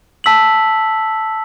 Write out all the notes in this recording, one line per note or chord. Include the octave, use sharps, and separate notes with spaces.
A5 E6 B6 F#7